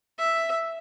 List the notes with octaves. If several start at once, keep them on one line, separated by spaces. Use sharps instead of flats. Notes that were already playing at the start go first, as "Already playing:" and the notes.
E5